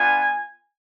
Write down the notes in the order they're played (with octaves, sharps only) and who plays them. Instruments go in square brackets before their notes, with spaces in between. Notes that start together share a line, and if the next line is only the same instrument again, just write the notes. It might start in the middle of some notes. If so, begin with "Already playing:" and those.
Already playing: [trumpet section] B3 D4 F4 G#5